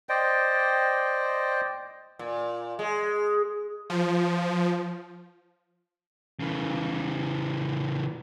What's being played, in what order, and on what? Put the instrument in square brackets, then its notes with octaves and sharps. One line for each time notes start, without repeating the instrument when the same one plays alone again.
[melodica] C5 D5 D#5 G5
[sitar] A#2
G#3
[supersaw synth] F3
[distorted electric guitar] C#3 E3